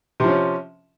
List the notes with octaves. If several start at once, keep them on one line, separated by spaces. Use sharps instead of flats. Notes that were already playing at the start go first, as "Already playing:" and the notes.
C3 F3 C#4